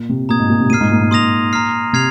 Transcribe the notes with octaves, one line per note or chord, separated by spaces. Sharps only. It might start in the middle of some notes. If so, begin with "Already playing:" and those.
Already playing: A#2
C3
A#2 A#5 D#6 G#6
G#2
A#2
C3
A#2 F6 C7 D#7
G#2
A#2
G#2
A#2 C6 D#6 A#6 F7
A#5 F6 C7
C3 F6 G#6 C7 F7